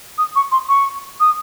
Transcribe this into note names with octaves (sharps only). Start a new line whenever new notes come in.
D#6
C#6
C6
C#6
D#6